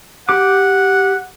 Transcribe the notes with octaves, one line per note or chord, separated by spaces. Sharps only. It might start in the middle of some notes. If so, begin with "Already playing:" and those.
G4 F#5 D6